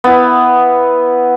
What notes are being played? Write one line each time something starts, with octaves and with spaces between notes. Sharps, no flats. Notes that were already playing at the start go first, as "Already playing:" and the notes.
B3 E4